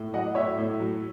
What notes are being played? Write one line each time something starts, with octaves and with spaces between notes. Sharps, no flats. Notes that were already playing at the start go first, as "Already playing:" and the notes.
Already playing: A2
F#3 D#5 F#5
A2 C#5 E5
A2
F#3